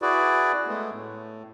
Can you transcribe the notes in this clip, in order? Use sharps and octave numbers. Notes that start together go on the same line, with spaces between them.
E4 F#4 G#4 B4 D5
G#3 A3 B3
A2